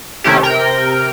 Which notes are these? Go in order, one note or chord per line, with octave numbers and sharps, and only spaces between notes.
C3 D#3 A3 C#4 E4 G4
C3 A#4 G5